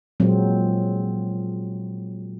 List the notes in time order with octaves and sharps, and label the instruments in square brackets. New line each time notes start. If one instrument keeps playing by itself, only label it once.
[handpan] A#2 F#3 G#3 C4